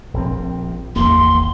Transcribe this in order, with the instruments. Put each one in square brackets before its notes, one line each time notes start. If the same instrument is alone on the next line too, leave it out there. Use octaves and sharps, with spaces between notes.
[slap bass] A#1 C4
[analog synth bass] D1 [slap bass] G#1 E2 A#3 [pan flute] C6